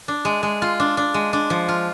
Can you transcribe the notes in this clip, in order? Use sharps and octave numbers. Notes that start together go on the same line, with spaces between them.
D4
G#3
G#3
F4
D4
D4
G#3
D4
F3
F4